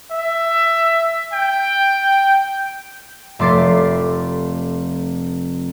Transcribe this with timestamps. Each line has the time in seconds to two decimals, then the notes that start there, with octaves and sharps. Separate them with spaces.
0.11 E5
1.33 G5
3.39 F1 A3 C6 D6 A6 B6